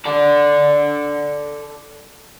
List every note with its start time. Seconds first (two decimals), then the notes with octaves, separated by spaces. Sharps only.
0.05 A4 D5